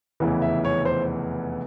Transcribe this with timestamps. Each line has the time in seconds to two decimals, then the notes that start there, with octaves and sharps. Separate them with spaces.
0.20 F1 E2 C#3 E3
0.42 E5
0.65 C#5
0.85 C5